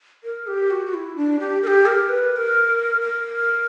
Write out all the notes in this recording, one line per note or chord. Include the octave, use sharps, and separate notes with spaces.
A#4
G4
F#4
F#4
E4
D4
G4
A#4
G4
A#4
B4
B4
A#4
A#4